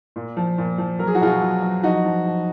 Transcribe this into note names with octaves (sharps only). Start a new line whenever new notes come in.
A#2
F3
A#2
F3
F#3 A#4
G#4
F#4
B2 F4 G#4
F#3
F#3
F3 D#4 F#4
F3
F3